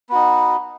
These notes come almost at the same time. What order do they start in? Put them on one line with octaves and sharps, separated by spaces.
B3 F#4 D#4